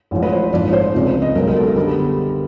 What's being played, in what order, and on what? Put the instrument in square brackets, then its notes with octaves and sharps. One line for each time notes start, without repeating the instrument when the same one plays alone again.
[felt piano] A1 A2 F3 G#3
B4
C5
A#1 G#2 F3 D5
C5
C#2 C#3 F3 G#3 C4
D#5
B1 B2 G#3 B3 A#4
A#4
A4
A#4
D3 G3 B3 A4